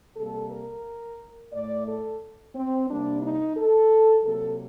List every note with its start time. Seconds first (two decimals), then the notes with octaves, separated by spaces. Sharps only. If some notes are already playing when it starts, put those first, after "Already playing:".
0.17 C3 G3 A#3 A4
0.51 A#4
1.53 A2 A3 D5
1.87 A4
2.55 C4
2.89 C3 G3 A#3 D4
3.22 D#4
3.57 A4
4.25 C3 F#3 A#3 A4